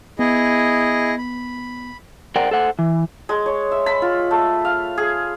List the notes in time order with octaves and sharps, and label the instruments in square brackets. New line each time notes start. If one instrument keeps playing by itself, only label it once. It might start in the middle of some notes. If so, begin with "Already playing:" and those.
[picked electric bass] B3 [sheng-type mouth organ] E4 G#4 D#5
[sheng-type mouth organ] B5
[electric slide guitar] A#4 C5 D5 F#5 G5
A4 C5 F#5
E3
[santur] G#3
C#5
E5
B5
F4
A3
F5
G#4